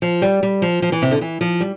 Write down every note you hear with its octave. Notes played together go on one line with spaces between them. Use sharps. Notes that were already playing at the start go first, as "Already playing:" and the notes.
F3
G3
G3
F3
F3
E3
C3
D3
E3
F3
G3